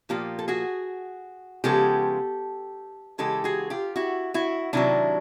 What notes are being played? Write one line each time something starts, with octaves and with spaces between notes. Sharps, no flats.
A#2 F3 A#3 F4 G4
A4
F#4 G#4
C#3 F3 G#3 B3 G4 A4
C#3 E3 G#3 G4 A4
F#4 G#4
F4 G4
E4 F#4
E4 F#4
C3 D#3 F#3 D4 E4